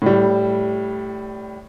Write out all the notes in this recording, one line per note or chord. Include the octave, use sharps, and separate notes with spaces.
A2 G3